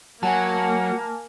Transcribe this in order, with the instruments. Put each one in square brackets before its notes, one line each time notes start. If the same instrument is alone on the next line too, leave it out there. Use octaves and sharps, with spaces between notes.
[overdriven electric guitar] F#3 [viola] A#3 [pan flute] F#5 [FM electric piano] G#5 A5